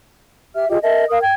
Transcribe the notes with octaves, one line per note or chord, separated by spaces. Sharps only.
G4 E5 F6
F4 G4 G#4 D#5
A#4 D#5 E5 A5
A#4 F5 D#6
G5 G#6